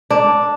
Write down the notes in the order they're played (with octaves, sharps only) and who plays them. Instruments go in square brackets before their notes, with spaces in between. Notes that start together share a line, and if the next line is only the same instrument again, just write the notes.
[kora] D4